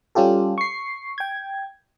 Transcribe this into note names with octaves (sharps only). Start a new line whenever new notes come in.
G3 C#4 F4 G4 A4
C#6 C7
G5 G#6